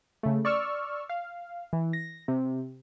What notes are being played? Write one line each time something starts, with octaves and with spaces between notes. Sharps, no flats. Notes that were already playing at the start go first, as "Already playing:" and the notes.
C#3 A3
D5 C#6 E6 F6
F5
E3
A#6
C3